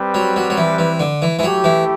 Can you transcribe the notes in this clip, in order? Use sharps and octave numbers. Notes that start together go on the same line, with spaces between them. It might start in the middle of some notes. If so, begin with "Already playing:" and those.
Already playing: G3 C4 G4 B4
F#3
F#3
F#3
E3
E3
D3
E3
E3
F#3 A3 E4 G4
E3